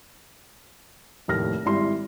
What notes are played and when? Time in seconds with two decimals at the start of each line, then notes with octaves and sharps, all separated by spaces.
1.28 F1 D#2 A2 F6 A#6
1.65 G#1 G3 E4 C6